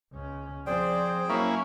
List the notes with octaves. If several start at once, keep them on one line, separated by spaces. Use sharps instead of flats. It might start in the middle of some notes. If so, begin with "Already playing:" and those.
C#2 C#4
F3 C4 G#4 C5 D5 G5
F#3 A#3 C#4 E4 C#6